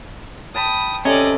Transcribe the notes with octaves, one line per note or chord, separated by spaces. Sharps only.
G5 A5 B5 D#6
C3 C#4 A4 D5 D#5